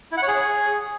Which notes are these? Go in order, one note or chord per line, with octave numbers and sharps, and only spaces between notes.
E4
F#5
C#5
G#4